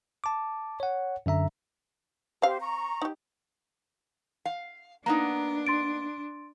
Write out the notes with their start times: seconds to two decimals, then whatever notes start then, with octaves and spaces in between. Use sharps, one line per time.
0.24 A5 D6
0.80 C#5 F#5
1.26 F#2 D3 E5 A#5
2.42 C4 G4 C5 F5
2.61 A#5 C#6
3.02 D#4 G4
4.45 F5
5.06 A#3 B3 D4 D#4 A#5
5.67 C6 A6 D7